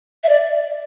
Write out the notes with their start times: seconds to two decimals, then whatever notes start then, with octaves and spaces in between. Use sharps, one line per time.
0.24 E5
0.29 D5